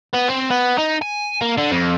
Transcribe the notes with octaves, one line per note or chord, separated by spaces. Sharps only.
B3
C4
B3
D#4
G#5
A#3
D3
F2